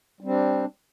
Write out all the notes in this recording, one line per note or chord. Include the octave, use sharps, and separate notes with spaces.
G3 C4 D4